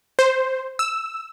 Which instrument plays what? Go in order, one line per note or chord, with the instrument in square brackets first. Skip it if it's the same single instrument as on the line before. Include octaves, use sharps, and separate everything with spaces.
[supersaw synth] C5
E6